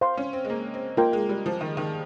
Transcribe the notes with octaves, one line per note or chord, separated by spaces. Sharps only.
C5 F5 C6
C#4
C4
G#3
A#3
C4
A#3 F4 A#4 D#5 G5 C6
G#3
G3
F3
D#3
D#3